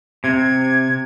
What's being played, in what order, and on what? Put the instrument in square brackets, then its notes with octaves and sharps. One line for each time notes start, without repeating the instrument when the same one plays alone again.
[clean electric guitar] C3 [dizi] G#6